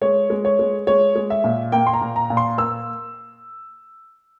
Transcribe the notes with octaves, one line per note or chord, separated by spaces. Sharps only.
G#3 C#5
G#3
C#5
G#3
G#3 C#5
G#3
E5
A#2
A#3 G5
C6
A#5
A#2
A#5
A#2
C6
A#3 E6